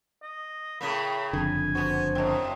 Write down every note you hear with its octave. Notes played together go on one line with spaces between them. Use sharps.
D#5
A2 C#3 A#3 B5
F#1 F2 D3 G#5
B3 F#4 C5 A5
F#2 A2 C4 D#5